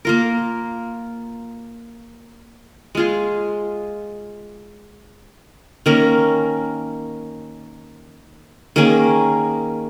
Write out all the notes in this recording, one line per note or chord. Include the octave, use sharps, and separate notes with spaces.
A#3 F4 A#4
G#3 F4 G#4
D#3 A#3 C#4 A#4
D#3 A#3 C#4 G#4